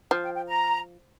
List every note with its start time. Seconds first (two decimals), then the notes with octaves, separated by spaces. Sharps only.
0.11 F3 G5
0.24 G5
0.35 G5
0.47 A#5